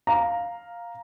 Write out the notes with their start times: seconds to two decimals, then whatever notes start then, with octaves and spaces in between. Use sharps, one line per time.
0.07 F5 A#5